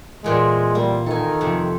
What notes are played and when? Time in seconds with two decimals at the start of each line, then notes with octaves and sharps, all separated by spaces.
0.24 E2 A#2 G#3 C4
0.75 G3 A#3
1.06 D#3 A4 G#5
1.41 F2 C3